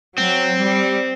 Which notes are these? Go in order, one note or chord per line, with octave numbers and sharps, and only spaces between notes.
F#3 C4
G3